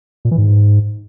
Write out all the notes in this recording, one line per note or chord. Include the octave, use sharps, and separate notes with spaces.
A#2
E3
G#2